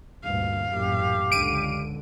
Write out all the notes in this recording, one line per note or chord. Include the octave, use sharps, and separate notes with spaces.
D2 G2 A#2 F5
A1 F#2 A#2 G4
C#2 D3 D7 D#7